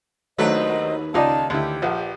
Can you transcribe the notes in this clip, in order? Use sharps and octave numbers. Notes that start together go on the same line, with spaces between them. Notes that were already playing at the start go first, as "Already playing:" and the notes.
D#2 F#3 A3 D4 B4 C5 D#5
F#4 A#4
C#2 D#4 F4 D5 D#5 A5
D2 E4 G4
A#1 F3 B4 D5 F#5